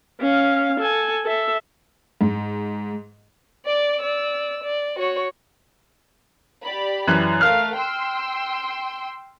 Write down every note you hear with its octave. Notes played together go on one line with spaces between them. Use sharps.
C#4 F5
A4 G#5
A4 E5
G#2
D5 D6
D5 E6
D5
F#4 C#5
G4 D5 B5
F#2 E3 F#6
A3 A#4 F5 F6
G5 C6 E6